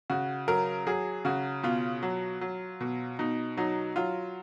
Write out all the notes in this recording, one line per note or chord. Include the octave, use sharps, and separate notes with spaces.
C#3 F#4
F#3 A#4
F#3 G#4
C#3 F#4
B2 F4
F#3
F#3
B2
B2 D#4
F#3 D#4
F#3 F4